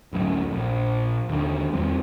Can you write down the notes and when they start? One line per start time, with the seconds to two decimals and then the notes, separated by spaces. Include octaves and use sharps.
0.13 D1 A1 F#2
0.51 A#1
1.29 D#2 D3
1.73 E2 G3 C4